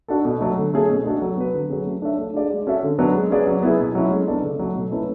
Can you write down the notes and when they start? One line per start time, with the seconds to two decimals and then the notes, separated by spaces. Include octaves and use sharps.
0.08 D4 F#4 A4
0.25 B2
0.41 F#3 A3
0.58 D3
0.74 A3 C#4 G#4
0.90 B2
1.06 A3 D4 F#4 A4
1.22 F#3
1.37 B3 F#4 B4
1.54 D3
1.69 F#3 C#4 G#4
1.86 A3
2.02 D4 A4 C#5 E5
2.19 A3
2.34 D4 G#4 D5
2.50 G#3
2.67 C#4 F#4 A4 E5
2.83 D3
2.99 F#3 B3 D4
3.15 G#3
3.30 C#4 G#4 B4 D5
3.47 F#3
3.63 B3 E4 G#4
3.79 B2
3.95 F#3 A3 C#4 E4
4.11 G#3
4.27 B3 D4 A4 D5
4.43 C#3
4.59 F#3 A3
4.75 B2
4.91 A3 C#4 E4 B4